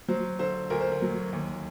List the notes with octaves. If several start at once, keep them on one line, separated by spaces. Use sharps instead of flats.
F#3 C5
D3 C5
D2 A#4
C5
A#4
F#3
D#2